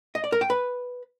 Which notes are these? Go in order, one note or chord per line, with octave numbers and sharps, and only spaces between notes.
D#5
D5
A#4
G5
B4